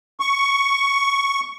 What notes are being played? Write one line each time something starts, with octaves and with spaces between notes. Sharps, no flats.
C#6